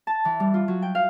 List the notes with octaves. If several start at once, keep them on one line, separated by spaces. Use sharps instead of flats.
A5
E3
G3
F4
F#3
G5
F5